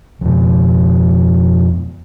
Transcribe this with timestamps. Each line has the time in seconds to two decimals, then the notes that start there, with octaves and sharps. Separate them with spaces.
0.21 F2 B2